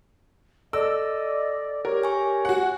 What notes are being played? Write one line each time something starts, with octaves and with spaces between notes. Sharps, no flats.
A4 D5 D#5 E6
G4 A#4 C#5
G#5 C#6
F#4 F#5